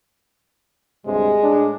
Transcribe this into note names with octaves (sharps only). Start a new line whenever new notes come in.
D2 G2 C3 G#3
A2 D4